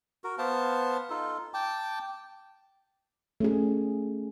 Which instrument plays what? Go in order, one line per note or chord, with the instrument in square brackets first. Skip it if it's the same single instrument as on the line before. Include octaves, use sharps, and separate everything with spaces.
[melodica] F#4 A#4
B3 C5 F5 A5
D#4 F4 A4
G5 A5 D6
[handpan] A3 C#4 G#4